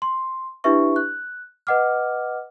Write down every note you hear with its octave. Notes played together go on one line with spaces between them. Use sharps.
C6
D4 E4 G4 B4 E5 C#6
F#6
B4 D#5 F#5 D6 F6